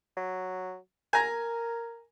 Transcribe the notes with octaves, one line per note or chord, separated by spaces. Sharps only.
F#3
A#4 G#5 A#5